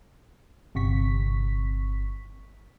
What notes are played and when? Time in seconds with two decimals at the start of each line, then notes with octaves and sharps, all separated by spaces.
0.75 G1 C3 C#6 B6